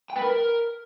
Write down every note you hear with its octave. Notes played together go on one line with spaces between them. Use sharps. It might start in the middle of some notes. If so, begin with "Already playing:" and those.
G5
B4
A#4